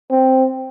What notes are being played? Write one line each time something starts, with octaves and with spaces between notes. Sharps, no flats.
C4